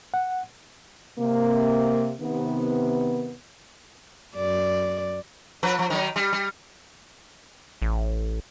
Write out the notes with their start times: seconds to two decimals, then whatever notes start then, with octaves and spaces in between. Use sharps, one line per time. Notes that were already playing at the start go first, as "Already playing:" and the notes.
0.14 F#5
1.19 C3 A#3
2.22 C3 D#3 B3
4.36 F#2 D5
5.63 F3 B4
5.79 F3
5.90 D#3 F#3 D#4
6.16 G3
6.33 G3
7.82 A1